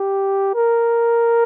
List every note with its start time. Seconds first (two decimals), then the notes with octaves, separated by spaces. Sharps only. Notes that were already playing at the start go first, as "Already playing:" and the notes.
Already playing: G4
0.55 A#4